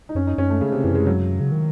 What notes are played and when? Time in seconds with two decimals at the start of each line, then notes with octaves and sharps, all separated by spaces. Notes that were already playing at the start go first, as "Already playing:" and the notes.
0.09 D#4
0.15 F#2 C#4
0.27 D#4
0.38 F#2 C#4
0.50 A3
0.61 C#3
0.72 C3
0.84 F#2 E3
0.95 G#3
1.07 F#3
1.40 C#3
1.52 D#3